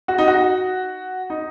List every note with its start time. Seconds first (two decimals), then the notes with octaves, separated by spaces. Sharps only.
0.08 F#4
0.18 D#4
0.28 F#4
1.30 D#4